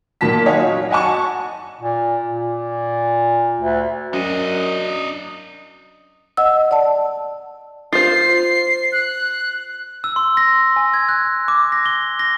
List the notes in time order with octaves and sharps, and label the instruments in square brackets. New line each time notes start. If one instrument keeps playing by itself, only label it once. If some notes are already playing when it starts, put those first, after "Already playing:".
[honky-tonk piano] A#2 D#3 F#3 A5 B6
D#4 C#5 D#5 F5 F#5 G#5
F#3
D#5 F#5 G#5 A5 C#6
[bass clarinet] A#2
A#2
D2
[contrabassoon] F#2 [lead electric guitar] D4 D#5
[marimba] D#5 F#5 E6
D5 F#5 A5
[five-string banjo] F4 C5 [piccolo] C7
[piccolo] F#6
[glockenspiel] E6
C6
A#6
G#5
G#6
F#6
D6
A#6
G7
A#6